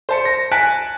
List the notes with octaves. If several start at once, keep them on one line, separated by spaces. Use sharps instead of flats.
C5 A5 C#7
A#6
G#5 A5 F#6 B6 D7